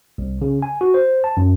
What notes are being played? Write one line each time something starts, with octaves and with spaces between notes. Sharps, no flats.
C2
C#3
G#5
F#4
C5
A5
F#2